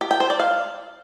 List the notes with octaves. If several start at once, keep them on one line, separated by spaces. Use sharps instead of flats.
G4
G5
C5
D5
F5